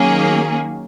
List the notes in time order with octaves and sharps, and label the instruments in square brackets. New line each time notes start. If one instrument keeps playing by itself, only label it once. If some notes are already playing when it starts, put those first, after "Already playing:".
Already playing: [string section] D#3 F#3 A#3 C#4 G#4